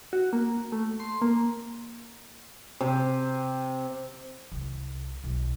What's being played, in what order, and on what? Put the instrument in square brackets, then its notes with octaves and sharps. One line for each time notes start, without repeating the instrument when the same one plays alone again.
[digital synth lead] F#4
A#3
A3
C6
A#3
[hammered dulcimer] C3
[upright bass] C2
B1